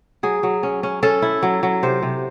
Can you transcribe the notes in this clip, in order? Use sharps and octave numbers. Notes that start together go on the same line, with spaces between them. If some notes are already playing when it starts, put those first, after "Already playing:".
F#3 G#4
F#3
C#4
C#4
C#4 A4
E4
F#3
F#3
C3 C5
C3